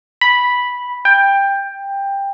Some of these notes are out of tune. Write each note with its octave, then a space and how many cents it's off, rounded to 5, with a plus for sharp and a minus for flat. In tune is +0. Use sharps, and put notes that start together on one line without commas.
B5 -5
G5 +15